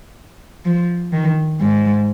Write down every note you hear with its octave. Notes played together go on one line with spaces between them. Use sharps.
F3
D#3
G#2